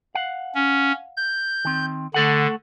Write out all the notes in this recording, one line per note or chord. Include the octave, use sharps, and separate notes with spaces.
F5 F#5
C#4
G6
D#3 C4
D3 A3 A4 F#5